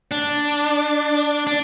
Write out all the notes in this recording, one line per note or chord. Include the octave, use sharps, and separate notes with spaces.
D4
D4